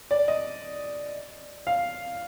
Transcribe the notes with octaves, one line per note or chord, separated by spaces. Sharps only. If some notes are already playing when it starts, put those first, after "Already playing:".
D5
D#5
F5